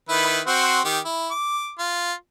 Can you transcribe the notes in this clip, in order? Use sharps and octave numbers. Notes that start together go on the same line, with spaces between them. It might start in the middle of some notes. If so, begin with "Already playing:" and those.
D#3 E4 B4
C4 F#4 C5
D#3 G4
E4
D6
F4